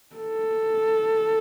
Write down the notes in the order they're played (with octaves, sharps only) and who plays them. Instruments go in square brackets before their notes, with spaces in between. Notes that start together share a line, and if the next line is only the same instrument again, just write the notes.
[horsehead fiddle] A4